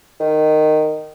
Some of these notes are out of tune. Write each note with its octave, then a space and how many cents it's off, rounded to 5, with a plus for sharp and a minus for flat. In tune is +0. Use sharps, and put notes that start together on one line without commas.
D#3 -15